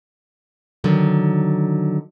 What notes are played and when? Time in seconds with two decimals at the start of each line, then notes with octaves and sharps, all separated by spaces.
0.84 D3 D#3 F#3